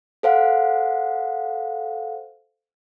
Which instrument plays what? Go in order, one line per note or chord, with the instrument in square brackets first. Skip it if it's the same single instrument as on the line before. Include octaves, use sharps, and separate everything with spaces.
[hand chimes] A4 C5 F5 F#5